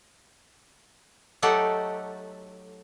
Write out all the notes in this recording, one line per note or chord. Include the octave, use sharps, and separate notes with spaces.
F#3 A3 D#4 G4 A4 F#5